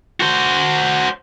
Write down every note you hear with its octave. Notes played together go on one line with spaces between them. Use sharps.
F#4 C5